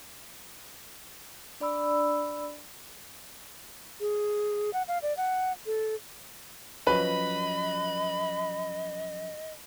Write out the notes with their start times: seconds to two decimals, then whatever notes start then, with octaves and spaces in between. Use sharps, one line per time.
1.60 D4 D5 B5 E6
4.01 G#4
4.73 F#5
4.88 F5
5.02 D5
5.17 F#5
5.66 A4
6.87 F3 F#3 C#4 B4 D#5 B5